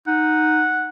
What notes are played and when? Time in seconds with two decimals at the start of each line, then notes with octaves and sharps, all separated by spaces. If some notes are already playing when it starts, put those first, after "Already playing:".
0.07 D#4 F#5